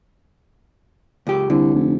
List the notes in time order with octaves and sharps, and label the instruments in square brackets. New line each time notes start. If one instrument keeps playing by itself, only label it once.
[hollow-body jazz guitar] C#2 G4
[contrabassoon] C2 [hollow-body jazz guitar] D3
[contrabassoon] F1